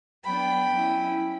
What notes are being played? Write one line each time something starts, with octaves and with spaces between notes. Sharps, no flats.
F#3 B3 D4 G5 B5
F#3 C#4 E4